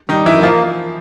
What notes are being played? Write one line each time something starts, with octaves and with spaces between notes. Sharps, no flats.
D#3 G3 D#4
F#2 E3 E4
F3 A#3 F4